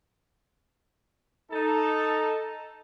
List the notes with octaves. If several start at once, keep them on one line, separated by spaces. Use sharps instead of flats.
D#4 A4